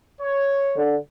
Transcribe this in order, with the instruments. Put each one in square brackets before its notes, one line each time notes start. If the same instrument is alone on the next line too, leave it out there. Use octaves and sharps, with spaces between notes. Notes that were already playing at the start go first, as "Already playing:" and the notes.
[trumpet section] C#5
[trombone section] D3